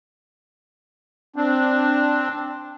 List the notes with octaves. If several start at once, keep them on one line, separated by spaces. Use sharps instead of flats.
C4 D4